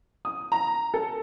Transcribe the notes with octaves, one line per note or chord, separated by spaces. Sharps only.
D#6
A#5
A4